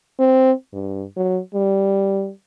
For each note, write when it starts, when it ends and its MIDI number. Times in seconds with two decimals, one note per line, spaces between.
0.19 0.52 60
0.73 1.04 43
1.17 1.40 54
1.54 2.31 55